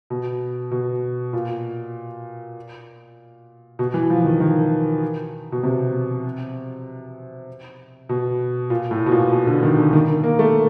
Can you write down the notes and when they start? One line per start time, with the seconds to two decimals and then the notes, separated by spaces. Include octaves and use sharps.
0.10 B2
0.71 B2
1.33 A#2
3.79 B2
3.94 E3
4.10 F3
4.24 D#3
4.40 D#3
5.52 B2
5.63 C3
8.09 B2
8.70 A#2
8.91 A2
9.06 B2
9.12 A#2
9.32 B2
9.47 D3
9.63 D#3
9.78 D3
9.93 D#3
10.24 A#3
10.39 A3